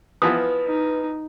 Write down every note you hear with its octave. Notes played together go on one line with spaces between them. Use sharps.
E3 F3 B3 B4 D#6
D#4